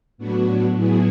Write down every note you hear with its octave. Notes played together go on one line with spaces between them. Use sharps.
A2 F#3 B3 D4 F#4
A2 F#3 B3 E4 G#4